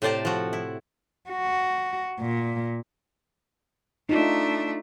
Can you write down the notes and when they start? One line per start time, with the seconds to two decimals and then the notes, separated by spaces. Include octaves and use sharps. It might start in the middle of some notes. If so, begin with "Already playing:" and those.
0.02 A2 C3 C5 D5 A5 A#5
0.25 F3 F#4
0.53 E4
1.30 F#4
2.20 A#2
4.09 A3 D4 D#4 F4